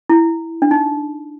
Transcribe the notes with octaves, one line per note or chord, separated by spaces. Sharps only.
E4
D4
D#4